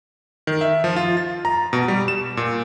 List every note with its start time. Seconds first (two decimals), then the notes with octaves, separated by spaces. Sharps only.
0.47 D#3
0.61 E5
0.84 F3
0.96 F4
1.17 A6
1.45 A#5
1.73 B2
1.88 G3
2.08 E7
2.37 A#2